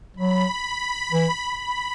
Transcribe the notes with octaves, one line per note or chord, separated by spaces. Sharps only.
F#3 B5
E3
B5